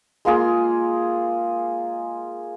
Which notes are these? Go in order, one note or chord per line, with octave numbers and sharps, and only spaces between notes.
G#3 A#3 F4 G#4